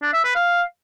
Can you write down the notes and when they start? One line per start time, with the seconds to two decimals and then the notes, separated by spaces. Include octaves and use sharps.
0.02 D4
0.13 E5
0.24 B4
0.35 F5